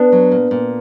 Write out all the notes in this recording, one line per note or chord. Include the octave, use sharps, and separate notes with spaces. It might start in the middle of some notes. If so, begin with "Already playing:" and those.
Already playing: B3 D4
F#3
A#2
A#2